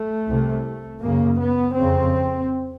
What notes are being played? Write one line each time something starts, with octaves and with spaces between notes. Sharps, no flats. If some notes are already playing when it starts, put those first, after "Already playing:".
Already playing: A3
C2 C3
F#2 C#3 A#3
B3
F2 C#3 C4